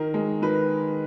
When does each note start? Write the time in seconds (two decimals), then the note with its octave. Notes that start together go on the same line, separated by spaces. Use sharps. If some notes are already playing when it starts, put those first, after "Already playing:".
Already playing: D#3 A#4
0.14 G#3
0.42 D#3 B4